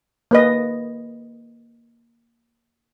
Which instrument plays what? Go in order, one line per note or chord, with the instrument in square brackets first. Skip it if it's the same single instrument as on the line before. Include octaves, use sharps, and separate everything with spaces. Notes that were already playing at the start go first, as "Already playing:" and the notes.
[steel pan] A#3 B4 D#5